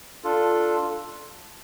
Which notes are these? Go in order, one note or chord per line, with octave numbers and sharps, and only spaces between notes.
D4 F4 A4